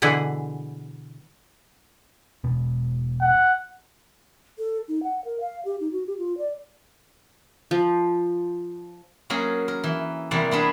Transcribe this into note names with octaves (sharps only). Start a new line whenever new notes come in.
B2 D3 E3 E4 G#4
E1 B2
F#5
A4
D#4
F#5
A#4
F5
G4
D#4
F#4
G4
F4
D5
F3
F#3 A#3 C#4 G#4
A#4
E3
E2 C3 G3 A#3 D5 F#5
A#3 B3 D4 G#4